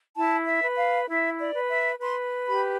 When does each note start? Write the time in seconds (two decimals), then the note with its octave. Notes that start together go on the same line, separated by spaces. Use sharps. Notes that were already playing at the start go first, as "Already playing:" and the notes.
0.15 E4 A5
0.46 E5
0.62 B4
0.77 F5
1.08 E4 E5
1.39 D5
1.53 B4
1.69 E5
2.00 B4 C6
2.46 G4 B5